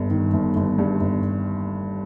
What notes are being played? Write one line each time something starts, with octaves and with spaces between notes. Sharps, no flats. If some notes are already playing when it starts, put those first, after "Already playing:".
Already playing: G1 G2
D#3
G1
G1
G2
G1